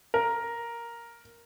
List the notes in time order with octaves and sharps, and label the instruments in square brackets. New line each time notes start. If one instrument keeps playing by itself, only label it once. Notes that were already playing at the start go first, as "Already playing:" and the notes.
[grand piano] A#4